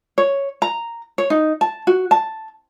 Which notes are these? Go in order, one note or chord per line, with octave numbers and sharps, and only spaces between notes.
C#5
A#5
C#5
D#4
A5
F#4
A5